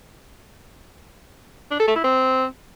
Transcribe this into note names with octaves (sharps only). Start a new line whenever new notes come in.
D4
A4
A3
E4
C4